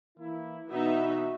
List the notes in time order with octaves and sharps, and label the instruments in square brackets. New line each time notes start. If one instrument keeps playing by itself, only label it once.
[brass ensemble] E3 A#3 E4
[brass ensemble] B2 E3 F#4 [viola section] B3 D#4 E5